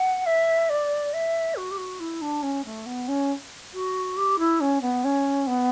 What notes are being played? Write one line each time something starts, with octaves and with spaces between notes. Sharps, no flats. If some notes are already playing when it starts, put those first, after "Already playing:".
Already playing: F#5
E5
D5
E5
F#4
G4
F#4
E4
D4
C#4
A3
B3
C#4
F#4
G4
E4
C#4
B3
C#4
B3